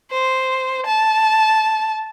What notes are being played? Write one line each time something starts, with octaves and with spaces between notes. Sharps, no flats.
C5
A5